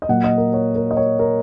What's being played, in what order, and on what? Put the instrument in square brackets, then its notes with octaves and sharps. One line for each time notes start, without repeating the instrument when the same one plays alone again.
[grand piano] D#5
A#2 F#3 A#3 F#5
D#5
A#4
C#5
A#4
D#5
C#5
A#4